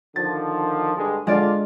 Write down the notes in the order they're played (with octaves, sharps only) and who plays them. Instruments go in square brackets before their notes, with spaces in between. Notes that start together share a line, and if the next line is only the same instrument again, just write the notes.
[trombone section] D3 D#3 F3 [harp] A6
[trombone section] G2 D3 G#3
[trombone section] D3 F4 [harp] G#3 D5